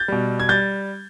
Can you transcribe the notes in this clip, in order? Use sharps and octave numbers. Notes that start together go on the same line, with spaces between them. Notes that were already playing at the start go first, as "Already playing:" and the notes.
Already playing: G6 A6
B2 G3
G#6
G3 G6 A6